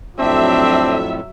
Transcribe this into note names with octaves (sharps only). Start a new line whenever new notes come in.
F2 A2 F#3 C4 D4 E5